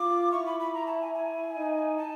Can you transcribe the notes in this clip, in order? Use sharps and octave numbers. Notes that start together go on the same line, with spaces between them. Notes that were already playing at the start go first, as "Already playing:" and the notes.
Already playing: F4 D6
E4 C#6
B5
B5
A#5
A5
G#5
G#5
D#4
A5